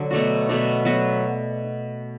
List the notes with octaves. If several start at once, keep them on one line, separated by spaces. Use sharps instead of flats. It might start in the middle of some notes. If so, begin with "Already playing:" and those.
Already playing: D3 F#3
B2 A3 D4 F#4
B2 A3 D4 F#4
F#3 B3 F#4 B4